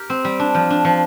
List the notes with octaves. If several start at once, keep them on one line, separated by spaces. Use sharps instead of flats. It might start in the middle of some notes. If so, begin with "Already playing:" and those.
Already playing: G4 A#4
C4
G3
D4
F3
D4
F3